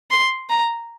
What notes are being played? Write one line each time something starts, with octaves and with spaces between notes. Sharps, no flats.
C6
A#5